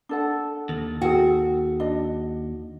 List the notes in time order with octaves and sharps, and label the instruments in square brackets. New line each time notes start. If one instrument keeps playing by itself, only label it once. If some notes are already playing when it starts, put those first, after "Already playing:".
[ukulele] D4 A4 F#5
[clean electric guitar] D#2 [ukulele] A4
[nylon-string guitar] F#4 [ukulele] G#4 A4 G5
[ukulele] D4 D#5